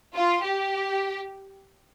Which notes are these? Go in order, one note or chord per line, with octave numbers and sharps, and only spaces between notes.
F4
G4